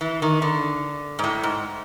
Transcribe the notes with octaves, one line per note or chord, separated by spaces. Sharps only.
E3
D#3
D3
G#2
A2
G#2